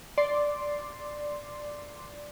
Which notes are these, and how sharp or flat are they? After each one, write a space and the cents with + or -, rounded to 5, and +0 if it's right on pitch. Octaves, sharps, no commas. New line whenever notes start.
D5 +0 C6 +0